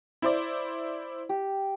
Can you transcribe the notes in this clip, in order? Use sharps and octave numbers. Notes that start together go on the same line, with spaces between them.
E4 C5 D5
G4